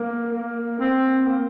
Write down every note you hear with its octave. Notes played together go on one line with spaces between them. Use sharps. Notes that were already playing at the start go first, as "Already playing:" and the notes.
Already playing: A#3
A#3
C4
A#3